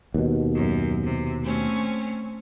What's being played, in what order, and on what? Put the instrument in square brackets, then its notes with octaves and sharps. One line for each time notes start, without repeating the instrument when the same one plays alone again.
[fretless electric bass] D#2 B2
[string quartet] F#2
C3
A3 C4 C#4